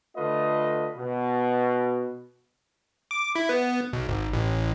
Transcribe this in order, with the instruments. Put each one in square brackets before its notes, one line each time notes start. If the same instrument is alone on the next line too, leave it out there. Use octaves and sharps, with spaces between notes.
[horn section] D3 A3 F4 B4 D#5
B2
[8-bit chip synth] D6
E4
B3
B1
G#1
A1